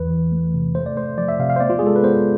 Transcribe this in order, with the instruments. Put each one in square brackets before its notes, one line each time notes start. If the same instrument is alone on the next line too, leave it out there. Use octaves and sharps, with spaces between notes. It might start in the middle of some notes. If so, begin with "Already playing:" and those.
Already playing: [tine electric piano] E2 E3 B4
E3
A3
C3
A3 C5
D5
A3 C5
F3 D5
E5
C3 F5
F5
C5
B3 D5
F4
G#4
G#3 A4
B4
B3 C5